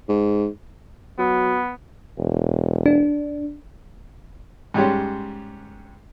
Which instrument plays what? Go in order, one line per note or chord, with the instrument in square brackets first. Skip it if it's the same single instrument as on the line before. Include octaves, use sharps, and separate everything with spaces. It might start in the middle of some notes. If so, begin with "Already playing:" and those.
[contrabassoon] G#2
[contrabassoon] F#3 [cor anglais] B3
[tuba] E1
[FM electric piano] D4
[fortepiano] G#2 G3 G#3 C#4 G4